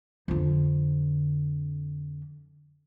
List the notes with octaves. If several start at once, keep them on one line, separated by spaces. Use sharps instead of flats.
F2 D3